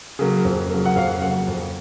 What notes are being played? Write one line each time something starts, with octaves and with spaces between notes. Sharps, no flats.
C#3 F#3 A#3
F2
C#3 F#3 A#3
F#5
F2 F5
C#3 F#3 A#3 F#5
F2